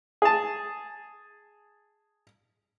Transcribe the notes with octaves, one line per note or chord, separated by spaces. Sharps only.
G#4 A5